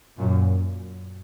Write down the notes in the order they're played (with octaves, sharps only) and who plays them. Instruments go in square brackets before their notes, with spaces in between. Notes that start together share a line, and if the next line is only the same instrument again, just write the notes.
[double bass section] F#2 A#2